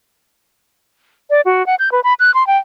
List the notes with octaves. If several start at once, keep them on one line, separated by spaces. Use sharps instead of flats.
D5
F#4
F#5
G6
B4
B5
F#6
C6
G5